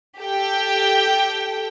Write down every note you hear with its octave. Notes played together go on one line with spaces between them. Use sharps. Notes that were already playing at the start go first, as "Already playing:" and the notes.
G4 A4 G5